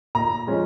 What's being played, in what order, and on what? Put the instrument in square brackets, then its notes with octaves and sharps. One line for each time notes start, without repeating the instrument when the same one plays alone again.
[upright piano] A#2 A#5
F3 G#3 C#4